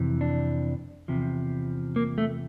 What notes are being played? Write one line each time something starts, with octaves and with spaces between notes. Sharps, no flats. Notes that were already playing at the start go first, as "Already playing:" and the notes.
Already playing: F2 C3 E3
D4
E2 C3 F3
A#3
A3